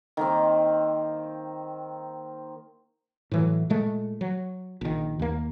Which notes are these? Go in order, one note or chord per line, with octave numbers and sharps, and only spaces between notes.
D#3 A#3 C4
A2 E3 F#3
A#2 G#3 A3
F#3
A#1 D#3
D#2 A#3